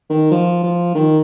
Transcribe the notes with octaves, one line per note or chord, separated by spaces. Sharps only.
D#3
F3
F3
D#3